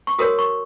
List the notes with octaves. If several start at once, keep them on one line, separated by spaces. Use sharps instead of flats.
C#6
F#4 A#4 C#5 D#6
C#6